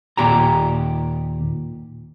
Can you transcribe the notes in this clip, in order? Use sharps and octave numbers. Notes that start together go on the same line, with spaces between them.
D#2 A#2 G4 A#5